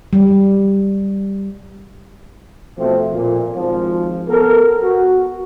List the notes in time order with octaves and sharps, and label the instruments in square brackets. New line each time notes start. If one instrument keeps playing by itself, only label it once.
[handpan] G3
[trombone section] B2 F3 A3 C4
A#2
G#1 F3
B3 A4 A#4
F#4